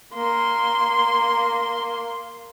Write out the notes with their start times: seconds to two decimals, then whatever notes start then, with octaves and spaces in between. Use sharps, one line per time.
0.14 A#3 C6